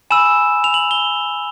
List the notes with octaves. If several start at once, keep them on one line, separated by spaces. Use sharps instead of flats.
G#5 B5 E6 E7
F7
F#7
G7